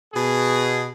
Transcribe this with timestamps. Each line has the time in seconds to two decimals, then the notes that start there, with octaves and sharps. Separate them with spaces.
0.14 B2 G#4